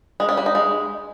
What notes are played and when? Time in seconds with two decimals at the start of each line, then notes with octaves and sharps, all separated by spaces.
0.20 G#3
0.29 C#4
0.37 G3
0.46 D#4
0.55 G#3